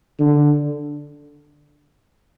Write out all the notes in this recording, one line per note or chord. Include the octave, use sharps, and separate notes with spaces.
D3